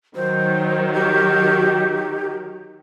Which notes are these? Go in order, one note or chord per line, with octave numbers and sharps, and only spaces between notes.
D#3 F#3 C5
G4